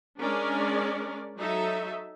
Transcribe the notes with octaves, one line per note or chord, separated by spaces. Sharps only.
G#3 C#4 D4 A#4 D5
F#3 D#4 A4 E5